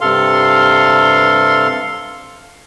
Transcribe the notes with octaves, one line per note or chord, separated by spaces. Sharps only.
G2 C3 A4 F5 C6